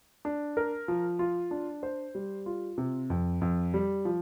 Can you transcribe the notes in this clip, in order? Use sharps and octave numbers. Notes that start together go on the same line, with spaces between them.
D4
A#4
F3
F4
D4
C5
G3
F4
C3
F2
F2
G3
F3